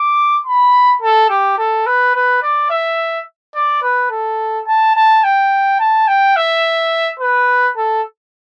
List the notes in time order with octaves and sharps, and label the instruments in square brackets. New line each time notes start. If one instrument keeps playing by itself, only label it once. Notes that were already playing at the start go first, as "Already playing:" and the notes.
Already playing: [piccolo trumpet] D6
B5
A4
G4
A4
B4
B4
D5
E5
D5
B4
A4
A5
A5
G5
A5
G5
E5
B4
A4